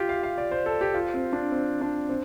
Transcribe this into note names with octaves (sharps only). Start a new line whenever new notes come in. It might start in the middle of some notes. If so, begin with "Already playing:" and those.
Already playing: F4 G4
F5
F5
D5
C5
A4
G4
F4
C4
D4
C4
D4
C4